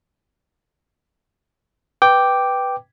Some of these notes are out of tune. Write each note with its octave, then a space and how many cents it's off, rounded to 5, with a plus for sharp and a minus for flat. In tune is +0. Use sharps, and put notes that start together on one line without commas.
B4 +0 G5 +0 D6 +0